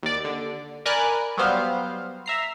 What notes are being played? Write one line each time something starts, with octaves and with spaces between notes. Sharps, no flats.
D#2 D5
D3
A#4 D5 G#5 B5 F#6
F#3 G3 B3 C5 F5
E5 A#5 C7